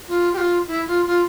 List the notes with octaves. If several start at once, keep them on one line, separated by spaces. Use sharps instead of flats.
F4
G4
F4
E4
F4
F4